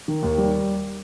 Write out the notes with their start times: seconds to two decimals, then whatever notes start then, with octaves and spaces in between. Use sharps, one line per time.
0.08 D#3
0.23 D#2
0.38 G3